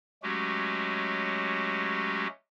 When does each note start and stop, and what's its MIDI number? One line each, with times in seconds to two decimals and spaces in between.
0.23 2.27 54
0.23 2.27 56
0.23 2.27 57
0.23 2.27 61
0.23 2.27 66
0.23 2.27 67